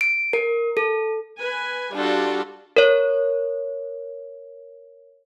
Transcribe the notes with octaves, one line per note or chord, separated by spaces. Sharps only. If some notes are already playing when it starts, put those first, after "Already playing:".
D7
A#4
A4
B4 G#5
G3 D4 F4 F#4 A4
A#4 C#5